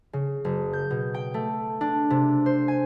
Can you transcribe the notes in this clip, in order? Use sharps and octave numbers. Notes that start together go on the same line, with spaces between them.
C#3
F#1
G6
B2
G5
A3
D4
C3
C5
G#5